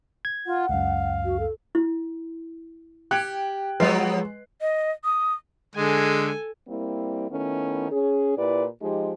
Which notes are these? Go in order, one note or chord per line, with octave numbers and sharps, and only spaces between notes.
G#6
F4 F#5
C#2 F#2 F5
F#4
A4
E4
G4 G5 F#6 G#6 D7
F3 F#3 G#3 B3 B4 D#5 C6 C7
D#5
D#6
D3 G#3 A4 G#5
G3 A#3 C4 E4
D#3 A3 B3 C#4 E4
C#4 G#4
A#2 E4 G4 B4 D5
F3 G#3 D#4 G4